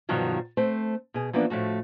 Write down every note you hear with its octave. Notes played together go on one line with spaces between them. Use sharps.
G2 B2 D#3 F3 F#3
A3 C4 C5
B2 G#4
E3 F3 A#3 B3 D4
A2 F3 A3 F#4